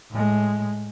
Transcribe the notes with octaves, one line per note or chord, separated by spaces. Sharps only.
A2 G#3